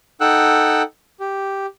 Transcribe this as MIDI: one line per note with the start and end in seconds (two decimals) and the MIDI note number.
0.21 0.82 63
0.21 0.82 69
0.21 0.82 78
0.21 0.82 79
0.21 0.82 88
0.21 0.82 90
1.20 1.66 67